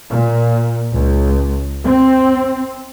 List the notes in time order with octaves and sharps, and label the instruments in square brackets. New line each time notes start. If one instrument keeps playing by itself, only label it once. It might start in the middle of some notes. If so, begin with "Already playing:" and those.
[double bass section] A#2
C#2
C4